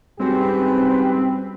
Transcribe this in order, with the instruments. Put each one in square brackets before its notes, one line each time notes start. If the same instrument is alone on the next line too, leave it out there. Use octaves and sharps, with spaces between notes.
[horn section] G#2 G4 B4 [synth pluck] G3 C#4 F#4 [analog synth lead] C4